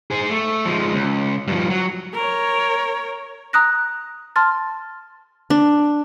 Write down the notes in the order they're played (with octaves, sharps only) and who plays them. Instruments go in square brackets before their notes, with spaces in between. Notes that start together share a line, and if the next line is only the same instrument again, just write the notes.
[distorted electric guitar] G#4 C5
A3
F3 G#3
C#2
G2 F3
F#3
[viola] A#4 C#5
[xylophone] A#5 D#6 F#6 A#6
A5 C6 F6 A6
[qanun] D4